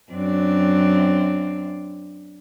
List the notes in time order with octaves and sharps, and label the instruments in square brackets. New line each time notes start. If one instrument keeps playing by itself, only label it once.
[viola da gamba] F#2 C4 D4